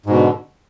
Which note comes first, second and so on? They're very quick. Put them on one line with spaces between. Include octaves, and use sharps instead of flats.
G#2 B2 D3